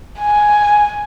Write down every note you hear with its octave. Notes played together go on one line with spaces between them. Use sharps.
G#5